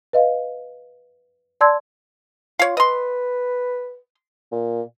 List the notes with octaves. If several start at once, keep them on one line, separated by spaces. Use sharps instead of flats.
B4 D#5 F5
D5 A5 C6 E6 G#6
F4 C#5 F5
B4 D#5 C6
A#2